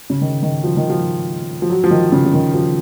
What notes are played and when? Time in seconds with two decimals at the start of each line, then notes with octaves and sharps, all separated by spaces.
0.10 C#3
0.21 D#3
0.43 D#3
0.64 F3
0.77 D#3
0.90 F3
1.62 F3
1.70 F#3
1.84 F3
1.91 D#3
2.12 C#3
2.25 C#3
2.34 D#3
2.54 F3